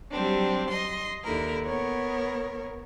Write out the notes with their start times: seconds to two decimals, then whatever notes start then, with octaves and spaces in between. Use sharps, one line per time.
0.11 F#3 G3 C4 D4
0.71 D#5 C6
1.23 D#2 D3 E4 A#4
1.64 B3 A#4 C#5